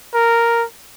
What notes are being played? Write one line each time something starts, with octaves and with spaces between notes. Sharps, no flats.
A#4